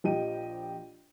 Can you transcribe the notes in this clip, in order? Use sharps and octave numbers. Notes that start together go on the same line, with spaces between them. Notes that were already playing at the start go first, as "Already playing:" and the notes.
A#1 F3 G4 D#5 G5 D#7